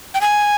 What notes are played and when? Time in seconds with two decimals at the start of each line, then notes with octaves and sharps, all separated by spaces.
0.14 G5
0.21 G#5